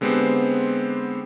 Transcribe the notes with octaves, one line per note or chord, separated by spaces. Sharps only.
D3 G#3 B3 C4 G4 C5